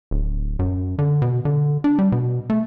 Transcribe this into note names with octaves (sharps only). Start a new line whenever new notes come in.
D1
F#2
D3
B2
D3
D4
G3
B2
A3